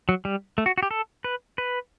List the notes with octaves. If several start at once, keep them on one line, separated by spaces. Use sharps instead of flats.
F#3
G3
A3
F#4
F#4
G4
A4
B4
B4